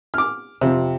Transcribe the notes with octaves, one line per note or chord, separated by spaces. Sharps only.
D6 F6
F2 C3